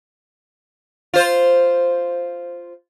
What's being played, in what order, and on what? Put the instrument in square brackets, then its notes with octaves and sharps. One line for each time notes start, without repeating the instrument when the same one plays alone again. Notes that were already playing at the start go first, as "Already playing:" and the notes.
[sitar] F4 C5